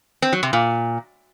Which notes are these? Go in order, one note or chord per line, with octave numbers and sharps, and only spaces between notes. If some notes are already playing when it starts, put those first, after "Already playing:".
C4
F#3
C3
A#2